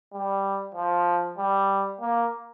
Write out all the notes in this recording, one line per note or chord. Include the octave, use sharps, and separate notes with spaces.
G3
F3
G3
A#3